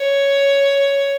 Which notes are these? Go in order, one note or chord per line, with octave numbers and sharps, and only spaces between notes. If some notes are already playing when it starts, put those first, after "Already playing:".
Already playing: C#5